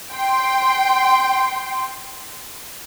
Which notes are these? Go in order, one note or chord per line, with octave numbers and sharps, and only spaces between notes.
G5 C6